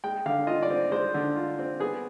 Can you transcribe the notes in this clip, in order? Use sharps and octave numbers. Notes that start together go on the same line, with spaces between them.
G#3 G5
D3 F5
F4 D#5
D5
C4
G#3 C5
D3
F4
C4
B3 G#4